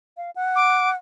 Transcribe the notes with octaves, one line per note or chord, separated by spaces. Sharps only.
F5
F#5
D6